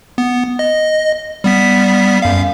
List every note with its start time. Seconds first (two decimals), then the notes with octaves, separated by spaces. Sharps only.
0.18 B3
0.59 D#5
1.44 G3 B3 B6
2.22 F#2 F5